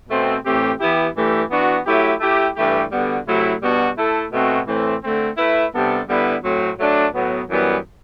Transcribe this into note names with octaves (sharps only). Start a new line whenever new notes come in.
B2 A3 C4
A2 E3 A3 C4 G4
E3 B3 E4 G4
G2 E3 A3 E4 G4
E3 B3 D4 F#4
F#3 A3 E4 G4
A3 E4 G4
G2 E3 A3 E4 G4
D3 G3 B3 F#4
C3 F#3 A3 E4
B2 G3 B3 D4 F#4
A3 E4 A4
B2 A3 C4 F#4
A2 E3 A3 C4
D3 A3 C4
A3 E4 B4 E5
C3 G3 B3 D4 A4
D3 G3 B3 E4 B4
A2 F#3 A3 C4
F#3 A3 D4
A2 F#3 B3
F#2 E3 G3 B3